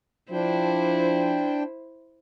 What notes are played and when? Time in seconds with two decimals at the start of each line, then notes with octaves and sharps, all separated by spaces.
0.32 F3 D4 E4 C5 G5